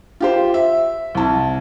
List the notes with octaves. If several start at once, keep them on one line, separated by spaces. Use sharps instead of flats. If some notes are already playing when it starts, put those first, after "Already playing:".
F4 G4 C5
E5
C2 A5